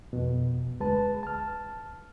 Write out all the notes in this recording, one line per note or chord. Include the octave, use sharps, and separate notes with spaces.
F2 B2
D2 G#3 B4 A5
A5 F6